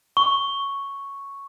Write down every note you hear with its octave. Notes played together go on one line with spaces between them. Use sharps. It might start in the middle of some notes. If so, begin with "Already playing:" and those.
C#6